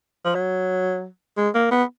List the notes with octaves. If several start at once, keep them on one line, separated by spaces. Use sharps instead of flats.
F3
F#3
G#3
A#3
B3